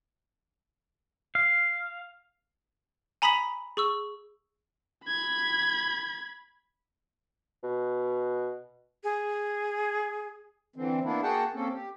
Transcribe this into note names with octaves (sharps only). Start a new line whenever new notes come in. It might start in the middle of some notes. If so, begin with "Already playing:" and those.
F5
G#5 A#5 B5 D#6 B6 F#7
G#4 C#6 E6
B5 G#6
B2
G#4
D3 E3 C4
A#3 B3 D4 E4
A#3 F#4 G#4 F#5 G5 A5
A#3 C4 C#4 A4
G4